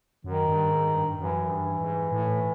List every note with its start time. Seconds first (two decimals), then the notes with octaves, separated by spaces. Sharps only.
0.24 F#2 D#3
0.49 G2
0.71 G#2
0.94 G2
1.18 F#2 E3
1.50 G2
1.81 G#2
2.12 A2